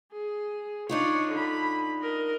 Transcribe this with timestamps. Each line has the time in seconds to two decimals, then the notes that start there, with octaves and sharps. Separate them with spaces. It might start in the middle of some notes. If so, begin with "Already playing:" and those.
0.12 G#4
0.89 D4 D#4 F4 C#5 D5
1.31 D3 B5
2.02 A#4 D#5